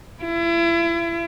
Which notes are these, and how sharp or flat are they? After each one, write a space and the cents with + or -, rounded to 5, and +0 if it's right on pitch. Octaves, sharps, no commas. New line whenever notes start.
E4 +35